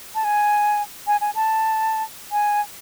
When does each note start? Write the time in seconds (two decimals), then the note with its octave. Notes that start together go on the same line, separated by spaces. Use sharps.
0.15 A5
0.24 G#5
1.07 G#5
1.21 G#5
1.35 A5
2.32 G#5